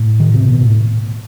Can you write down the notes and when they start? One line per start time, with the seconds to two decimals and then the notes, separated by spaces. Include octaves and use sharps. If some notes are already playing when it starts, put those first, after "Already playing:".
Already playing: A2
0.20 D#3
0.34 C3
0.48 B2
0.62 A2